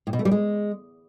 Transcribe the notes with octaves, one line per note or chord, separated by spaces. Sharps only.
A2
B2
A3
G3
G#3